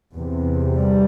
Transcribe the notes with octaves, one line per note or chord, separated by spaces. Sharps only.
E2 C3
G3